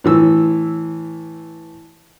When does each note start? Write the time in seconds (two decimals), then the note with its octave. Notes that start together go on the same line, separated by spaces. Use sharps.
0.04 A2 E3 E6